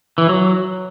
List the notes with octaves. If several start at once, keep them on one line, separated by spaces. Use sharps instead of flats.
E3
F#3